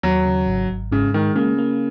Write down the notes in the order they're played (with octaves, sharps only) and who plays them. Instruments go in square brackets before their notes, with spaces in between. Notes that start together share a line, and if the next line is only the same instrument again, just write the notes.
[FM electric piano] D#2 [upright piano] F#3
[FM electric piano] C#3
G#1
G#1
[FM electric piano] G#2 [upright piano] C#3
[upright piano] D#3 [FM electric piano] G#3
[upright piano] C#3 [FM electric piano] A#3
[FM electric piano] A#3